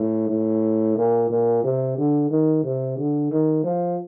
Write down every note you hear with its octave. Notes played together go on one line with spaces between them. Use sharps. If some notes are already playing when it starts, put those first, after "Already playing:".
Already playing: A2
A2
A#2
A#2
C3
D3
D#3
C3
D3
D#3
F3